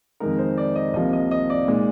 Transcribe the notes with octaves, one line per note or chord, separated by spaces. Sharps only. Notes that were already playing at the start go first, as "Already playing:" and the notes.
F2 D#3 G#3 D#4 A#4
C5
D5
D#5
C2 C3 F3 A#3 D#5
D#5
D#5
D5
A#2 G#3 D#4